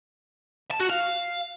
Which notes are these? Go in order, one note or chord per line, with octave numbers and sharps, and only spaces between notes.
A5
F#4
F5